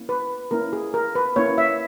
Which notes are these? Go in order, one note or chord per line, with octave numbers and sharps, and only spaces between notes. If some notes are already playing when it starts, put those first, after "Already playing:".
Already playing: A#3 C#4 E4
B4
A#3 C#4 E4 A#4
G#4
A#4
B4
A#3 C#4 E4 C#5
E5